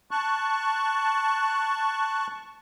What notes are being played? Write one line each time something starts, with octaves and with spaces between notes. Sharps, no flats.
A5 C#6 F#6